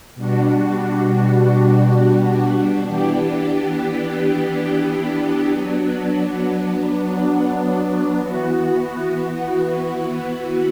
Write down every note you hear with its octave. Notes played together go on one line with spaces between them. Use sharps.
B2 G3 D4 F#4
E3 B3 D4 G4
F#3 B3 D4
E3 B3 F#4